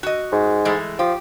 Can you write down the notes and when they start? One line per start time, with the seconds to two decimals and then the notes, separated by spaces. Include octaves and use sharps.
0.03 F#4 D#5
0.32 G#2
0.65 E3 G#3 A3
0.99 F3 G4